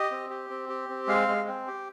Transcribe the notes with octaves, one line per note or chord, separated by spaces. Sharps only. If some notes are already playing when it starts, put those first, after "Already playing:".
Already playing: G4 D#5
C4
G4
C4
G4
C4
G#3 F5
G#3
C4
G4